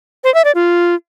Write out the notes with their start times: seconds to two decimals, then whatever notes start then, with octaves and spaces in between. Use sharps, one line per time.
0.24 C5
0.34 E5
0.45 D5
0.55 F4